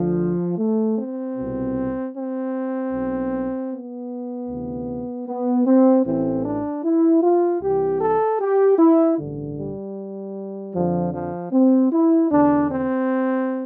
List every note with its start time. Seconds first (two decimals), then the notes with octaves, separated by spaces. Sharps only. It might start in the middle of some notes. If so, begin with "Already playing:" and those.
Already playing: D2 D3 F3
0.58 A3
0.98 C4
1.37 C2 B2
2.15 C4
2.93 B1 B2
3.71 B3
4.49 D2 C3 E3
5.27 B3
5.66 C4
6.05 A1 A2 E3 C4
6.45 D4
6.83 E4
7.23 F4
7.61 C2 C3 E3 G4
8.01 A4
8.39 G4
8.79 E4
9.18 A1 G2 D3
9.58 G3
10.75 F2 D3 F3
11.13 F3
11.52 C4
11.92 E4
12.31 E2 D3 D4
12.71 C4